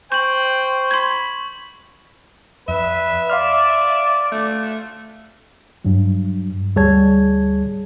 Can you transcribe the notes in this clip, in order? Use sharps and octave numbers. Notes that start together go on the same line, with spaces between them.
C5 G5 C#6 G6 F#7
B5 C6 G#6
F2 B4 E5
D5 F5 C6 F6
A3
G2 F#3
D2 G3 G#4 C#5 A5 G#6